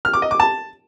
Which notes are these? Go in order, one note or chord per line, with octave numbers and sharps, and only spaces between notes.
F6
D6
D#5
D6
A5